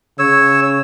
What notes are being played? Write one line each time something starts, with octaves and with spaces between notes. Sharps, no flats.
C#3 C#5 E6